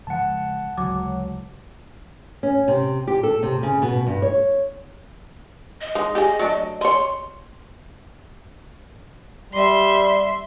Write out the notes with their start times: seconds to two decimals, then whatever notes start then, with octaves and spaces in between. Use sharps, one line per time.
0.07 C#3 F3 G#3 F#5 A5
0.77 D2 C#3 F#3 G#3 D6
2.43 C#4
2.68 C3
3.07 G4
3.23 A4
3.43 C3
3.63 C#3
3.82 B2
4.06 G2
4.22 C#5
5.81 D#5
5.95 G#3 D#4
6.15 G4 G#4 D#5
6.39 F#3 A3 D4
6.81 C#5 D#5 C6
9.53 G3 E5 C6